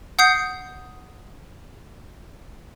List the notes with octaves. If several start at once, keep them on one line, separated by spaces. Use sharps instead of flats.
F#5 D#6 G6 C7